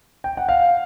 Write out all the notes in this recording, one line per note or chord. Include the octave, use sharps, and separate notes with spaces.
G5
F#5
F5